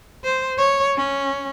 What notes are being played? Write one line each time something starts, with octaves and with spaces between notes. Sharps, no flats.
C5
C#5
C#4